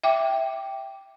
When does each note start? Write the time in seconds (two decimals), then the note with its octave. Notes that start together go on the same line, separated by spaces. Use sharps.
0.04 E5 G5 D6